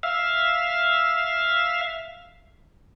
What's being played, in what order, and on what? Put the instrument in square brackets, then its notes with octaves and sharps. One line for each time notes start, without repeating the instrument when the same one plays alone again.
[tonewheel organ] E5 F5